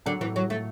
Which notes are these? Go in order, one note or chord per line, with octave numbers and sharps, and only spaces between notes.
D3 F#3
A2 E3
A2 F#3
A2 A3